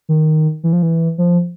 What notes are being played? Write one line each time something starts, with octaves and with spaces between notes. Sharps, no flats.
D#3
E3
F3
E3
F3